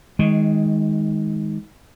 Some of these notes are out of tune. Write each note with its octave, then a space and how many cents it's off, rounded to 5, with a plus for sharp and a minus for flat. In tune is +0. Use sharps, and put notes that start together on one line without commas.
D#3 +25 G#3 +0